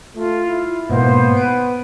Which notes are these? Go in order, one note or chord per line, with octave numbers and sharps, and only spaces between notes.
A3 F4
E4
G#2 B2 A#3 B3 C5
B4 D7 D#7